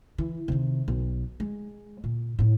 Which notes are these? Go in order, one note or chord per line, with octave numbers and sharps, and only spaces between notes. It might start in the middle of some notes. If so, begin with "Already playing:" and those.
E3
C3 D#3
B1
G#3
A#2
A2 E4